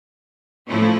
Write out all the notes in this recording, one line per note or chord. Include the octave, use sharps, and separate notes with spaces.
A2 F3 A3 C#4 E4